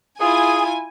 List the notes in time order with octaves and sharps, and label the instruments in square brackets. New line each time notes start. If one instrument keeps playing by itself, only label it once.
[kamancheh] E4 F4 [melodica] G#4 [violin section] G#5